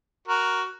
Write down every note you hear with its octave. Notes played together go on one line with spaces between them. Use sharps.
F#4 A#4